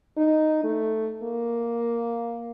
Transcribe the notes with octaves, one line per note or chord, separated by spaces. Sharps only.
D#4
A3
A#3